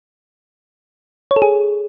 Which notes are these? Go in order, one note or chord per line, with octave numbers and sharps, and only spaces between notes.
C#5
A4
G#4